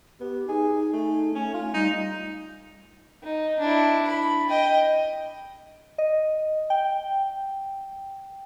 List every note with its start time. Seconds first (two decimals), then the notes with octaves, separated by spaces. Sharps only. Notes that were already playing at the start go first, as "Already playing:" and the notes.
0.20 B3 G4
0.48 D#4 G#4
0.93 A3
1.35 A3 C#4
1.54 F4
1.74 G3 D#4
3.24 D#4
3.60 D4 E4
4.07 B5
4.49 D#5 G5
5.98 D#5
6.70 G5